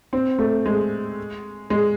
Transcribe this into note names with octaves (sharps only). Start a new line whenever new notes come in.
C4
A3
G#3
G#3